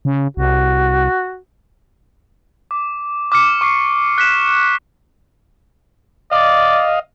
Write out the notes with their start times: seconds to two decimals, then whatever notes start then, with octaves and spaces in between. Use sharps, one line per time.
0.05 C#3
0.37 C2 F#4
2.71 D6
3.32 D6 F6 C#7
3.61 C#6 D6 C7
4.18 F#6 B6 E7
6.32 D5 D#5 F5